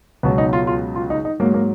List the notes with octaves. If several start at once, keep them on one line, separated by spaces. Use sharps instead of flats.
C#2 B2 F#3 B3
D#4
F4
F4
F4
D#4
D#4
G#2 F#3 A#3
A#3